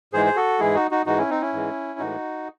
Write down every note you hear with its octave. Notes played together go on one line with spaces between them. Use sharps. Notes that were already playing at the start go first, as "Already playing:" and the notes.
G#2 E3 G#3 G#4 C5
C5
F#4 A4
G#2 E3 G#3 E4 G#4
D#4 F#4
D#4 F#4
G#2 E3 G#3 D#4 F#4
C#4 E4
C4 D#4
C#4 E4
G#2 E3 G#3
A2 E3 G#3 D#4 F#4